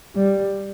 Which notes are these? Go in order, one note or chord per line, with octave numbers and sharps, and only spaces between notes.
G3